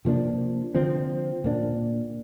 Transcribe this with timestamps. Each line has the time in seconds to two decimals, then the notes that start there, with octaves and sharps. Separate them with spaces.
0.05 C3 F3 A#3 D4
0.75 D3 F3 C4
1.44 A#2 A#3 D4